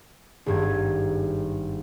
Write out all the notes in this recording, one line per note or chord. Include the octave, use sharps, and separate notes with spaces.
G#1 G2 G#6